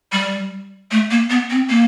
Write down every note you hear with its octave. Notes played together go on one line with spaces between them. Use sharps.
G3
A3
A#3
B3
C4
A#3